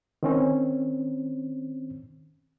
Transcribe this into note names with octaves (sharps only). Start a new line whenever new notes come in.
D#3 C4 C#4